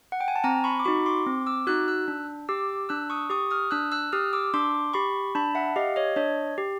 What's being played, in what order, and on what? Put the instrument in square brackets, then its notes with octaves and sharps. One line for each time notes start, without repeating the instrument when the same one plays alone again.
[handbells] F#5
G5
G#5
A5
C4 G#5 A#5
B5 C#6
D6
D#4 F#4 B5 C#6
C6 D6
C4
D6 E6
D#4 F#4 E6 F#6
E6 F#6
D4
G4 D6 E6
D4 E6 F#6
C#6 D#6
G4 C#6 D#6
D#6 F6
D4 E6 F#6
E6 F#6
G4 D#6 F6
D6 E6
D4 C6 D6
G4 B5 C#6
D4 A5 B5
E5 F#5
G4 D#5 F5
C#5 D#5
D4 C#5 D#5
G4